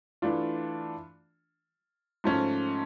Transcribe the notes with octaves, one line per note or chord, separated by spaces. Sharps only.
E3 A3 D4 F4
G#2 F3 A3 C#4